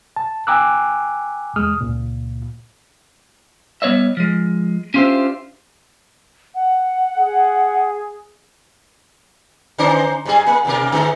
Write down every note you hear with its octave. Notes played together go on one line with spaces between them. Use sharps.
A5
G5 G#5 A#5 D6 E6 F#6
E2 G#3 D#6 F6
C#2 A#2
G3 B3 C#5 D#5 E5
F3 G#3
C#4 D4 F4 G4 C5 E5
F#5
G#4
D3 C#4 C5
G#2 G3 G#4
A#3
D#2 B2 A#4
G#2 D3 G#3